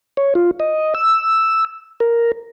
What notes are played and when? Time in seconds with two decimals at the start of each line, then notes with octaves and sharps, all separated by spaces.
0.17 C#5
0.35 F4
0.60 D#5
0.95 E6
2.00 A#4